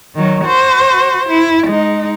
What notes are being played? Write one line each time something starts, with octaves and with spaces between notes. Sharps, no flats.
D#3 F#3
F#4 C5
E4
G#3 D#4